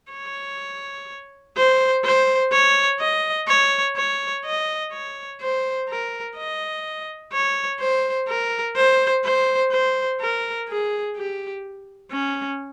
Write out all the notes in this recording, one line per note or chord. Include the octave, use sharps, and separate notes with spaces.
C#5
C5
C5
C#5
D#5
C#5
C#5
D#5
C#5
C5
A#4
D#5
C#5
C5
A#4
C5
C5
C5
A#4
G#4
G4
C#4